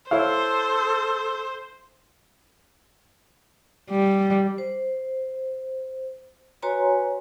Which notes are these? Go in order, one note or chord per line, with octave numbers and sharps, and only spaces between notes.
E4 A4 C5 C#5 F5
G3
C5
F#4 B4 C#5 G#5 A#5 C6